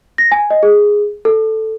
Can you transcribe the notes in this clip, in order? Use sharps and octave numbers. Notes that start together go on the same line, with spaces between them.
A#6
G#5
D#5
G#4
A4